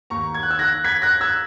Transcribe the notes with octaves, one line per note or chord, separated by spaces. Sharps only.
D#2 D#3 A#5 C#6
G#6
F#6
E6 G#6
F#6 A#6
G#6 B6
F#6 A#6
E6 G#6